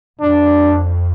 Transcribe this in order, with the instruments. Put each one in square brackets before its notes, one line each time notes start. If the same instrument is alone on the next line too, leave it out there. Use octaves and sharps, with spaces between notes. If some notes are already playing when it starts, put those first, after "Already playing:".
[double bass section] F2 [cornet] D4